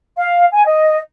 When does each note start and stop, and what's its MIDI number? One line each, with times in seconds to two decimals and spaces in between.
0.15 0.46 77
0.50 0.64 80
0.64 0.95 75